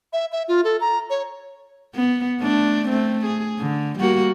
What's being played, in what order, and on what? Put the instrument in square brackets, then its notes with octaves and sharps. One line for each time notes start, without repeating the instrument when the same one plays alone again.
[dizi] E5
E5
F4
A4
A#5
C#5
[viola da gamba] B3
A3 D4
A3 C4
G#4
D3
G3 A#3 F#4